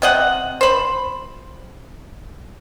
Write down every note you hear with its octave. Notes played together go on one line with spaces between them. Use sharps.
C3 D#5 F#5
C5 B5